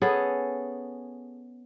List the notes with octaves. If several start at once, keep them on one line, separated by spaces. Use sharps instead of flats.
B3 C#4 G#4 A4